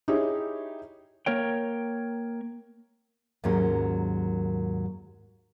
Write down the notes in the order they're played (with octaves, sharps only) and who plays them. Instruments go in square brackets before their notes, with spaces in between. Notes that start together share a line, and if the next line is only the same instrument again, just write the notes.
[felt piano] D#4 E4 G4 G#4 C#5
[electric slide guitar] A#3 A#4 C#5 G5
[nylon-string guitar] D#2 G#2 F#3 A#3 C#4